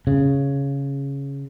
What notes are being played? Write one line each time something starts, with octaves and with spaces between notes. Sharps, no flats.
C#3